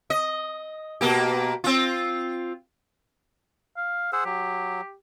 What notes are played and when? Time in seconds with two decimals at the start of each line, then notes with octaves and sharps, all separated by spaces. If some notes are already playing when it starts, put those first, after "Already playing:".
0.10 D#5
1.01 B2 A#3 G4
1.64 C4 F4
3.77 F5
4.13 G#4 C5 F#5 E6
4.25 F#3 G4